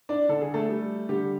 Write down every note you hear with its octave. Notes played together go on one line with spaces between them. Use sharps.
D4 D5
D3 A4
G#4
A3 A4
G3
D3 G3 G4